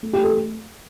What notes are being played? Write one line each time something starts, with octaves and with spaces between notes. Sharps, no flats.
A3
G4
A3
A4